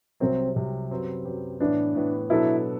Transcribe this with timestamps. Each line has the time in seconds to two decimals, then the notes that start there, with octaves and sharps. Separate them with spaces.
0.20 C2 C3 F#3 C4
0.56 C2 C3 F#3
0.91 F#2 F#3 C4 G4 B4
1.25 F#2 F#3 C4 G4 B4
1.60 A2 E3 B3 D4
1.95 A2 E3 B3
2.30 B2 F#3 B3 D4 E4 A4